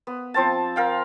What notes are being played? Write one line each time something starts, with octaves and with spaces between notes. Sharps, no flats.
B3
F3 C4 A5
A#4 F5 G5